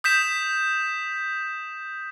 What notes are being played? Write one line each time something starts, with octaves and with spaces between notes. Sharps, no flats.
D#6 G6 B6 E7